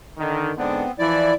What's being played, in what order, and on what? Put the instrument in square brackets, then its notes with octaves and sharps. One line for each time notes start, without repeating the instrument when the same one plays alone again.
[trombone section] D3 D#3
[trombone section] G#2 D3 D4 [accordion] B3 C4
[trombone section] E3 F3 [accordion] E4 D5